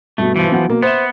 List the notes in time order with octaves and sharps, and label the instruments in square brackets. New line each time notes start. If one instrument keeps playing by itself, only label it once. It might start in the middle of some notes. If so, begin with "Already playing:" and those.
[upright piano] G2 B2 [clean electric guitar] A3
[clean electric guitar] E3 F3
[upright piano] F#3 B3 F#5
B2 A#3
[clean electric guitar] B3 [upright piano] C5 E5 E7